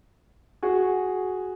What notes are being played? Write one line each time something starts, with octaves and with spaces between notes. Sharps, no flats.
F#4 G#4